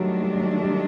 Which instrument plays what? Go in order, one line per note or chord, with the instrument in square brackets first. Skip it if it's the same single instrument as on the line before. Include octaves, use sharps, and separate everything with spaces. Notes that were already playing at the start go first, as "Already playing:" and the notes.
Already playing: [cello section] D#3 A3 D4 [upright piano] F#3 G3
[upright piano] G3
F#3
G3